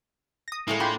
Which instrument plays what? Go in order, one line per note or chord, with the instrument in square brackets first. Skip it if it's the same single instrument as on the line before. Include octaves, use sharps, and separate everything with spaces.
[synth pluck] D#6 A#6
[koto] A2 G#3 C#5 [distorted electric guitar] A#3 [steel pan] E4
[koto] D4 [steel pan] F4 [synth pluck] G5 B5 C6